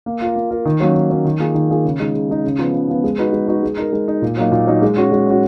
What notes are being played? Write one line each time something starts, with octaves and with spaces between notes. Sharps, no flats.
A#3
F4 A#4
A#3
F4 A#4
D#3
F#3 A#3 C#4
D#3
F#3 A#3 C#4
D#3
A#3 F4 G#4
D#3
A#3 F4 G#4
C#3
G#3 D#4
C#3
G#3 D#4
C#3
F3 B3
C#3
F3 B3
G#3
D#4 F#4 B4
G#3
D#4 F#4 B4
G#3
D#4 A#4
G#3
D#4 A#4
A#2
F#3 A#3 D#4
A#2
F#3 A#3 D#4
G#3
C#4 F#4
G#3
C#4 F#4